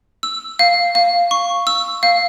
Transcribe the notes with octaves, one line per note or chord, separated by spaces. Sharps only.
E6
F5
F5
C#6
E6
F5